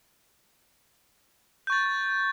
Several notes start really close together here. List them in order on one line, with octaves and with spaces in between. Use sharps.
G6 C#6 A6